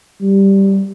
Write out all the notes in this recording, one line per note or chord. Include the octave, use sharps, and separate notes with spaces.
G3